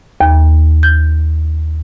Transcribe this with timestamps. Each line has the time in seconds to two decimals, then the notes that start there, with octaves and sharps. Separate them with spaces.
0.21 D#2
0.83 G6